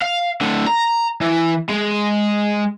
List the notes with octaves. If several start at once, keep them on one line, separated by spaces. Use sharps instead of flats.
F5
A2 D3
A#5
E3
G#3